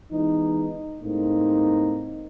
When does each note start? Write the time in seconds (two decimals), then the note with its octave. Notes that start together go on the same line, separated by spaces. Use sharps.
0.12 E3 G#3 B3 D#4
1.02 A2 G#3 A#3 C4 D#4